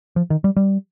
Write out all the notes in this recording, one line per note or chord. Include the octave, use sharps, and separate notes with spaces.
F3
D#3
G3
G3